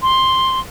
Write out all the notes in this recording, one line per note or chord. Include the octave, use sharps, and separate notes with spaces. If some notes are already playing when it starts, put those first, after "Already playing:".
C6